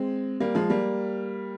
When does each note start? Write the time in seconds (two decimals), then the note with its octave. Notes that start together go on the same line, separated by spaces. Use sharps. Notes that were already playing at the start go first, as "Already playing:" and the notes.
Already playing: G#3 C4
0.40 G3 A#3
0.55 F3 G#3
0.70 G3 A#3